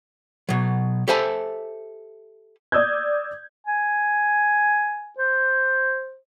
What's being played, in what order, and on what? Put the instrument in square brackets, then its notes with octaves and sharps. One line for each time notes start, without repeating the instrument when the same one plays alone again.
[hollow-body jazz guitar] B2 F#3
G4 A4 C5 E5 G#5 A5
[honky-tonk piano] D5 D#6 E6 G6 G#6
[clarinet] G#5
C5